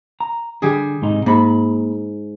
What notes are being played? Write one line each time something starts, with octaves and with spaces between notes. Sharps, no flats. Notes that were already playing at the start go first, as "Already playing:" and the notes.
A#5
D3 G3 G#4
G#2 C3 D#4
G#2 A#3 B5